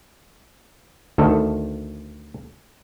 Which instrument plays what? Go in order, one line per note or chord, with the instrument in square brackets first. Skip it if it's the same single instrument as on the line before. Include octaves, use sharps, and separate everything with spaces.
[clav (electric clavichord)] D2 D#3 A4